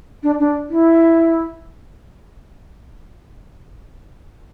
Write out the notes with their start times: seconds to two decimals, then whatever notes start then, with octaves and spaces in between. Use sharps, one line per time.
0.23 D4
0.40 D4
0.70 E4